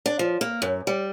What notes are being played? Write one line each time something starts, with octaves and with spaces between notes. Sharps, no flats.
D4
F3
A#3
F#2
G3